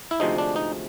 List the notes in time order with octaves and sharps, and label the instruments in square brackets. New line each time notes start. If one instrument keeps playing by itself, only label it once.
[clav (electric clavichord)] E4
D2 C3 F3 G#3 D#4
D4
D#4